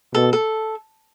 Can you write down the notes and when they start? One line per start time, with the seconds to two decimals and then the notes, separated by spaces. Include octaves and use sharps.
0.15 B2 A4
0.33 A4